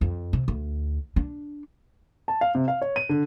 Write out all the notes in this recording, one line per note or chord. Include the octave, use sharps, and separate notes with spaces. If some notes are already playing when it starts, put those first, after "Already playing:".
F2
C3
D2
D4
A5
F5
C3
F5
C#5
D#7
D3